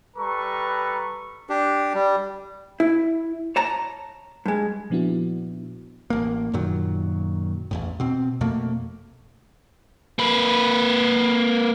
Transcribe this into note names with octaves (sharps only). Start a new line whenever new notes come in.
G3 A4 B4 A#5 C#6
D4 G4
G3
E4
C#5 A5 A#5
G2 G#3
A#2 F3 B3 D4 E4 F#4
A1 A#3
F#2 A#2 D#3 F#3
A1 E2 A2
B2 C4
F2 B2 A3 A#3
A#3 B4